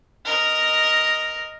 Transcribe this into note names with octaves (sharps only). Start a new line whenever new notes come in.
A#4 D#5